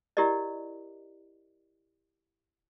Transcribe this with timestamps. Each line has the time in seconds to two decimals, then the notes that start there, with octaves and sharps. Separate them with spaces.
0.17 E4 G4 A#4 D5 D#5